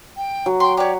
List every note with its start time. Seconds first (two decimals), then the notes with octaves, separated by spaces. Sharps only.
0.17 G5
0.46 F#3
0.60 G5 C6
0.77 G4 C#5 D5